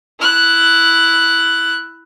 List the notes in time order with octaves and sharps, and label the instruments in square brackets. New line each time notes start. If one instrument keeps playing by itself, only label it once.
[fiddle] E4 F#6